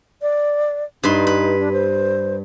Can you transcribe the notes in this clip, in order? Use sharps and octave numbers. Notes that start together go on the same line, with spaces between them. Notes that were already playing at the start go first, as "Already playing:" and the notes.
D5
G2 D#4 B4 C6
B4
D4
C5